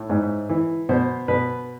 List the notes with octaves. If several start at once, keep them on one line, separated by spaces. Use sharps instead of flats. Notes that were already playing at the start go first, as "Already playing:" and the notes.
Already playing: A2
G#2
E3
B2 C5
B2 B4